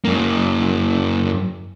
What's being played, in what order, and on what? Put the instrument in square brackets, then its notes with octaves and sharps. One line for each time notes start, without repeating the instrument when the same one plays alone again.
[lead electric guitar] F#2 A#3